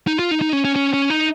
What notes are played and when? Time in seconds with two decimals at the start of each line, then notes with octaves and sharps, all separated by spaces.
0.07 D#4
0.19 F4
0.31 D#4
0.42 D#4
0.53 C#4
0.65 C#4
0.76 C#4
0.94 C#4
1.10 D#4